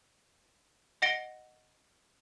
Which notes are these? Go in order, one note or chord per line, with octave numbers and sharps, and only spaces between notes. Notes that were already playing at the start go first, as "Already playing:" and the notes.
D#5 F#5 A#6 C#7 D7 G7